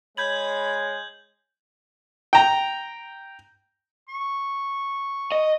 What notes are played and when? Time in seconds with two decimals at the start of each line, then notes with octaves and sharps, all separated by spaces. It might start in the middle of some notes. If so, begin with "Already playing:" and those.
0.17 G#3 C#5 B5 G6 G#6 F#7
2.33 G5 A#5
4.08 C#6
5.32 D#5